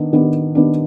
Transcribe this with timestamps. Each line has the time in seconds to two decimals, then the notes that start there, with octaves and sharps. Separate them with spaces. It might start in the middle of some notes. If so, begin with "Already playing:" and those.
Already playing: D#3 B3 D4
0.13 D#3 B3 D4
0.55 D#3 B3 D4